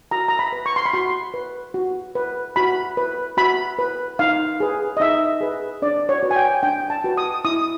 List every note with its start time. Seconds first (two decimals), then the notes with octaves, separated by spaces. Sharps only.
0.11 F#4 A#5
0.28 A#5
0.39 B5
0.52 B4
0.66 C#6
0.76 C6
0.86 B5
0.93 F#4 C6
1.34 B4
1.74 F#4
2.15 B4
2.56 F#4 B5
2.97 B4
3.37 F#4 B5
3.79 B4
4.19 D#4 F5
4.60 G#4 B4
4.97 D#5
5.00 D#4 E5
5.41 G#4 B4
5.82 D4 D5
6.09 C#5
6.23 F#4 B4
6.31 G#5
6.36 G5
6.63 D4 G5
6.90 A5
7.04 F#4 B4
7.17 D#6
7.45 E4 D#6